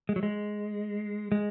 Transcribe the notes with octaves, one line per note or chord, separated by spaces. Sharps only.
G#3
F#3
G#3
G#3